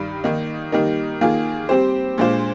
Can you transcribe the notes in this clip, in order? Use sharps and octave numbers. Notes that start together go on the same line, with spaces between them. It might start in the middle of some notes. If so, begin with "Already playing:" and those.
Already playing: G2 D#3 G3
D#3 A#3 D#4
D#3 G3 A#3 D#4 A#4
D#3 A#3 F4 G#4
G3 C4 G4 C5
A#2 G#3 D4 F4 C5